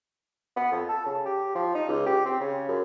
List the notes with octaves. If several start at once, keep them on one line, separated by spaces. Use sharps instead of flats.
B3
F2
A4
C#3
G4
F3
D#4
C#2
G4
C4
C#3
F#2